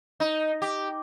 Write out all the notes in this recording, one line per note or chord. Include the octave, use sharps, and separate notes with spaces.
D#4
G4